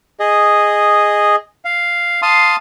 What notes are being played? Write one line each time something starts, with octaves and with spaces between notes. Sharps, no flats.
G#4 D#5
F5
F5 A5 C6 D#6